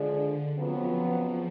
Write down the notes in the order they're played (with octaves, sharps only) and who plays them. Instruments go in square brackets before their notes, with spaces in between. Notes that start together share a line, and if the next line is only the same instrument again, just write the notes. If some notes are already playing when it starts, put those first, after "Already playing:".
Already playing: [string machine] D3 [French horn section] F3 G#3 D4 G#4 D5
[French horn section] F2 C#3 F#3 B3 [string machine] F3